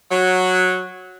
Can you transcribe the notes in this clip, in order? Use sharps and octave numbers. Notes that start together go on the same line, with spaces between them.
F#3